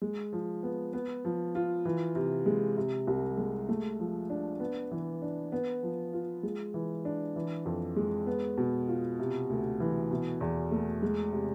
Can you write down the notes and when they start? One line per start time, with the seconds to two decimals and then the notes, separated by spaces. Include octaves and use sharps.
0.02 G#3
0.33 F3
0.63 B3
0.93 B3
1.25 F3
1.55 F4
1.85 E3
2.15 C3
2.46 G#3
2.77 C3
3.07 C2
3.38 G#3
3.69 A3
3.99 F3
4.30 D4
4.60 B3
4.91 E3
5.22 D4
5.52 B3
5.83 F3
6.13 F4
6.43 G#3
6.74 E3
7.05 D4
7.36 E3
7.66 F2
7.96 G#3
8.27 B3
8.58 B2
8.88 F4
9.19 C3
9.50 D2
9.80 E3
10.11 B2
10.41 E2
10.72 A3
11.02 G#3
11.33 C3